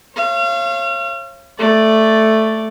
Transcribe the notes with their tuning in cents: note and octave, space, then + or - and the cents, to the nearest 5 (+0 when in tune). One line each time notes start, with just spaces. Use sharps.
C#5 -35 F5 -35
A3 +0 D5 +0